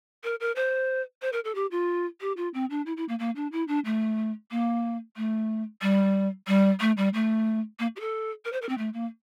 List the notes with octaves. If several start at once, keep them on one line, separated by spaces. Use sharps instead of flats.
A#4
A#4
C5
C5
A#4
A4
G4
F4
G4
F4
C4
D4
E4
E4
A#3
A#3
D4
E4
D4
A3
A#3
A3
G3
G3
A3
G3
A3
A#3
G4
A4
A#4
C5
A#4
C4
A3
A#3